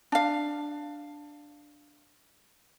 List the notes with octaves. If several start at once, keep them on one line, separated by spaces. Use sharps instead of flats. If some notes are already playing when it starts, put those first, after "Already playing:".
D4 F5